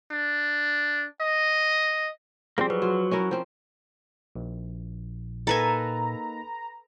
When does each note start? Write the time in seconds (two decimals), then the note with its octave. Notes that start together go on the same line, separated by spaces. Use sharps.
0.12 D4
1.21 D#5
2.58 F3 G3 A#3 C4 G#4
2.70 F#3 B4
2.82 F4 F#4
3.11 C#4 E4 A#4
3.31 F3 C4
4.35 A#1 A#2
5.47 A#3 D#4 A4 B4 G#5 A#5